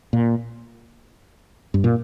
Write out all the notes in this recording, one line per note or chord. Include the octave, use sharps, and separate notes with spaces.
A#2
G2
A#2